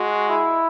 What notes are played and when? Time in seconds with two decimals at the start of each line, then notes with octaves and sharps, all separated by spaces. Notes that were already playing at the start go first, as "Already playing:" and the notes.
Already playing: G#3 F#4
0.29 E4